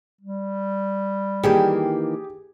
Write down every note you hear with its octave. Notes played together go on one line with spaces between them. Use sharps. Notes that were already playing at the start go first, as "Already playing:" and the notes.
G3
D#3 E3 A#3 G4 G#4